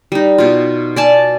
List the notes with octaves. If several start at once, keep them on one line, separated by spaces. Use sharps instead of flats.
G3 D#4
B2 F4
D5 G#5 A5